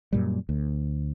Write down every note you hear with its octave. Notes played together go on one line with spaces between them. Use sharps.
F#2 A#2 G3
D2